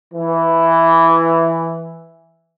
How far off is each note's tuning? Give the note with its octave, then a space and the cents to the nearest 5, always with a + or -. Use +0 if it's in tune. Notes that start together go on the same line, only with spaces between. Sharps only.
E3 +5